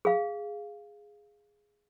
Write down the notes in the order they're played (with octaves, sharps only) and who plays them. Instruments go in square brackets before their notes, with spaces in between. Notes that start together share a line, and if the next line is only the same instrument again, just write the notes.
[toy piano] G#4 F5